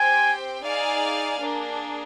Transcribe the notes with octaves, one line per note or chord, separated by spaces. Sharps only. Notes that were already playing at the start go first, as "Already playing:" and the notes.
Already playing: C4 G4 C5 G5 G#5
D#4 G#4 D5 F5 G#5
A#3 D4 G#4